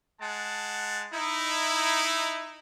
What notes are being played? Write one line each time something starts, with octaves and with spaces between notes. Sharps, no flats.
G#3 F#5 A5
D#4 E4